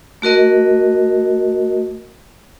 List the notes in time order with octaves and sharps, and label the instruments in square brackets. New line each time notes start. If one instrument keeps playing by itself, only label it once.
[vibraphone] A3 F#4 A#4 D#5